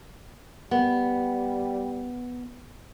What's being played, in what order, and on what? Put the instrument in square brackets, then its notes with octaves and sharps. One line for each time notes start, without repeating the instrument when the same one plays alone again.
[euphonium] G3 [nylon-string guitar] B3